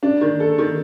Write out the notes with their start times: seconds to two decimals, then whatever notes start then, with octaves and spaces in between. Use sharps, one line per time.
0.03 D4
0.21 D#3
0.40 A4
0.58 D#3